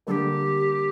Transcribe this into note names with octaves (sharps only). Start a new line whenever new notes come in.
D3 G3 A#3 G4 A4